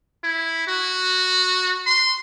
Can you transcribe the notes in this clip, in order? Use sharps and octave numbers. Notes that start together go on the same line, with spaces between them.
E4
F#4
C6